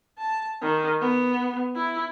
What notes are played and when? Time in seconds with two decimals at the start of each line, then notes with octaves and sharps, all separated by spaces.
0.19 A5
0.62 D#3
1.01 B3
1.76 E4